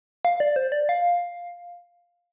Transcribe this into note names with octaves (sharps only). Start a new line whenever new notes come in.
F5
D5
C5
D5
F5